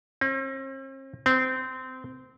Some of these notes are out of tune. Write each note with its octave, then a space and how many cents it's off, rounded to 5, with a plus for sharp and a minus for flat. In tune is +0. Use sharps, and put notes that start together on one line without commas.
C4 +45
C4 -20